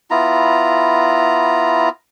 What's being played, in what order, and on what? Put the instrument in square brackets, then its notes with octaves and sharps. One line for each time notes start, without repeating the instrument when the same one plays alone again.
[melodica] B3 E4 F4 A#5